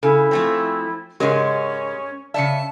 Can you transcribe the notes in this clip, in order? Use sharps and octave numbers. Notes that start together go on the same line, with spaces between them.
C#3 E4 A4 G#5
F3 A3 C4
G#2 C#3 G#3 C#4 G4 A#4 D#5
C#3 E3 D5 E5 A5 C#7